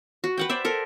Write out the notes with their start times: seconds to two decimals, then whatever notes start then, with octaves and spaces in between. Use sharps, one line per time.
0.24 F#4
0.38 B4 F#5 G5
0.49 C5 D5 E5
0.65 A4 A#4